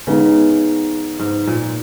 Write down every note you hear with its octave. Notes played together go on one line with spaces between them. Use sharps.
C#3 G#3 B3 D#4
G#2
A#2